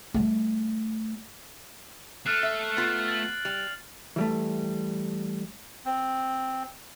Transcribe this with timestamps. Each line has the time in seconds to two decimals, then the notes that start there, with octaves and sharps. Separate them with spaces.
0.14 G3 A3
2.26 A3 F6 F#6 C7
2.43 E5
2.77 B3 F4 A6
3.08 A6 D7 F#7
3.45 G3 F7
4.16 E3 G3 A3
5.85 C4